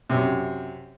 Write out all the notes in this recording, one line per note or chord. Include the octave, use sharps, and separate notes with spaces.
F#2 C3